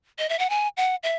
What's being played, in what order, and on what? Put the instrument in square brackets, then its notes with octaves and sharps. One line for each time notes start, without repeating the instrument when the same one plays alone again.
[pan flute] D#5
E5
F#5
G#5
F#5
E5